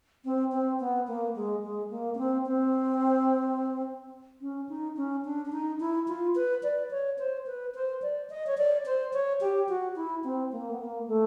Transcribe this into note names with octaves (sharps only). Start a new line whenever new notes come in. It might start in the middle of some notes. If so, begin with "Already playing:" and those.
C4
C4
B3
A#3
G#3
G#3
A#3
C#4
C4
C4
C#4
D#4
C#4
D4
D4
D#4
E4
F4
B4
D5
C#5
C5
B4
C5
D5
D#5
C#5
D5
C5
C#5
G4
F#4
E4
C4
A#3
B3
A#3
A3